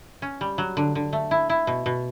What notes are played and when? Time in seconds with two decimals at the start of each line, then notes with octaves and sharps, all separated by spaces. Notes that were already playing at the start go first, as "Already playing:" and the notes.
0.22 C#4
0.41 G3
0.58 F#3
0.77 D3
0.95 D3
1.13 A3
1.31 E4
1.50 E4
1.67 B2
1.86 B2